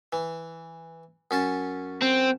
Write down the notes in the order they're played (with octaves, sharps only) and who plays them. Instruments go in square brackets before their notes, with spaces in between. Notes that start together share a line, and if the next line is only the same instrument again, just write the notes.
[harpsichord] E3
F#2 C#4 A5
[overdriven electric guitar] C4